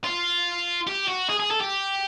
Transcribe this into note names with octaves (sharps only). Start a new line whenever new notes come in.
F4
G4
F#4
G#4
G#4
A4
G4